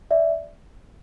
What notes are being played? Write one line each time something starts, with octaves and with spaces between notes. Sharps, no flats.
D5 E5